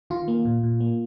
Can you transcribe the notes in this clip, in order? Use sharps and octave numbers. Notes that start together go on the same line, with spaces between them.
D#3 F4
A#3
A#2
A#2
A#3